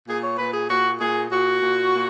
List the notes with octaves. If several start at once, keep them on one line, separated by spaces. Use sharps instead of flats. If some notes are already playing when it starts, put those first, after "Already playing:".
A#2 G#4
C#5
A#2 B4
G#4
A#2 F#4
A#2 G#4
A#2 F#4
A#2
A#2